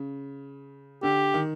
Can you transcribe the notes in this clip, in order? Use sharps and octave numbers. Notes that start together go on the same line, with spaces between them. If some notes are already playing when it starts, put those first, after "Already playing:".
Already playing: C#3
D3 G4
D#3